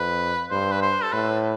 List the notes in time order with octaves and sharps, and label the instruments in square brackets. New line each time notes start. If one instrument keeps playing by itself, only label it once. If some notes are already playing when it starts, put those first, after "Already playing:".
Already playing: [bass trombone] F2 [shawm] B4
[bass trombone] G2 [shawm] C5
[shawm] B4
C5
A4
[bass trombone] A2 [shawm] B4